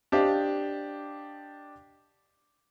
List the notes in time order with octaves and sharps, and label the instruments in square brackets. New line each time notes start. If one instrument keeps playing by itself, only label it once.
[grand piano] D4 G4 C5 D#5 F5